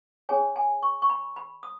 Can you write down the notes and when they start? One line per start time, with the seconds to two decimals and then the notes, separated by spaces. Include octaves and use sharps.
0.29 C#4 G#4 C#5 G#5
0.56 G#5
0.83 C#6
1.02 C#6
1.10 B5
1.36 B5
1.63 D#6